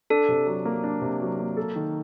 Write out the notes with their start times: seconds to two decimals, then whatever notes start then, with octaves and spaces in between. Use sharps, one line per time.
0.10 D4 A4
0.28 C3
0.47 F#3
0.65 A#3
0.84 D4
1.01 C3
1.20 F#3
1.39 A#3
1.57 A4
1.76 D#3